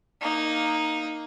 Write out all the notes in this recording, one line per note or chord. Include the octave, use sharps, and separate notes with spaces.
A#3 D#4